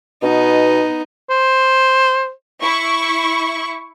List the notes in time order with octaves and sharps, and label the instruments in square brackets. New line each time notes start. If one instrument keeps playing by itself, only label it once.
[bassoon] B2 [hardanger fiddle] B3 D#4
[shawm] C5
[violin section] E4 C#6